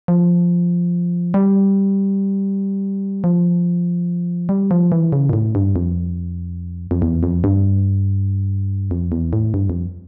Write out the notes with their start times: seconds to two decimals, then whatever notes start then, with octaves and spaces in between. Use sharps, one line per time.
0.08 F3
1.34 G3
3.24 F3
4.49 G3
4.71 F3
4.92 E3
5.12 C#3
5.29 A#2
5.33 A2
5.55 G2
5.76 F2
6.91 F2
7.02 E2
7.23 F2
7.44 G2
8.91 F2
9.12 E2
9.33 A2
9.54 G2
9.70 F2